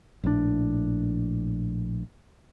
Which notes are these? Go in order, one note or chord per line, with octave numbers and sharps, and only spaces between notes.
A#1 A2 E3 D4